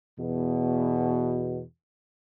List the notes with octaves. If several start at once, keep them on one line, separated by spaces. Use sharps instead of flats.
E2 B2